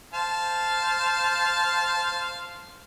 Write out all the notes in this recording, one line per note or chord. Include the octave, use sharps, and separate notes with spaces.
C5 F5 A5